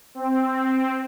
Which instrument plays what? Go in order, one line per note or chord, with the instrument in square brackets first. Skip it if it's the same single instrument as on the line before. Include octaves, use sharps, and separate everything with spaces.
[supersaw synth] C4
C4